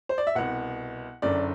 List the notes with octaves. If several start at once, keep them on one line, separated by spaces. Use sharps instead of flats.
C5
D5
E5
C2 B2 F#5
F#1 F#2 D3 D5